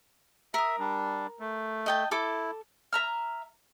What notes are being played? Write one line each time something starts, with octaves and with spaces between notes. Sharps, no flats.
A#4 E5 D#6
G3 D4
A3
D#5 G5 A5
E4 A4 D6
E5 A#5 F6